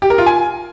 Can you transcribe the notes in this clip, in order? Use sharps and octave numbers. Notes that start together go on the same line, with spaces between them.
G4
A#4
F4
G#5